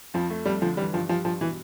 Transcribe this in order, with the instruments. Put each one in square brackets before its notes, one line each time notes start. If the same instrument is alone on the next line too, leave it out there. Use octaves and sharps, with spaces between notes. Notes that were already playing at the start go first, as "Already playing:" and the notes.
[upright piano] F2 [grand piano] F3
[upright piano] A3
[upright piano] F2 [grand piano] G3
[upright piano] D3 [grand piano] F3
[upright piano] E3 [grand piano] G3
[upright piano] G2 [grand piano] F3
[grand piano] F3 [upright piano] G3
[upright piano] G2 [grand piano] F3
[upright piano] B2 [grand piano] E3